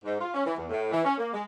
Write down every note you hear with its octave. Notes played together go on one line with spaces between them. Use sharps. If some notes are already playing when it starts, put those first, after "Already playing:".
G#2
F4
C#4
E3
E2
A2
E3
C#4
A#3
G#3